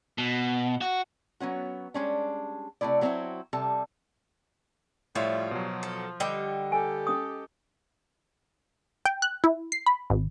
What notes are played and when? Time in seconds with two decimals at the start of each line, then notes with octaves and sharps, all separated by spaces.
0.18 B2
0.81 F#4
1.40 F#3 B3 C#4 F#4
1.94 G3 G#3 C#4 D4
2.81 C3 F3 A3 E4 D5
3.01 F#3 B3 C4 D4 E4 F#4
3.53 C3 G3 A4 A5
5.15 A2 F3 G3 F4 C#5 E5
5.51 B2 F#3
5.83 A4
6.20 D3 G3 D#5 G5 D6
6.72 G4 A4 G#5
7.07 C#4 D#6
9.05 G5
9.22 F#6
9.44 E4
9.72 C7
9.86 B5
10.10 G#1